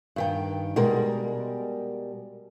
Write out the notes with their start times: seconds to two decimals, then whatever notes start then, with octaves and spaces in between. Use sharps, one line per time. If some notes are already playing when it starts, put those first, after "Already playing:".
0.16 G2 D#3 G5
0.76 B2 G3 G#3 A#4